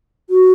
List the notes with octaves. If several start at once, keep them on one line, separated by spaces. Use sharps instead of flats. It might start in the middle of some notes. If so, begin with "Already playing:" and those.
F#4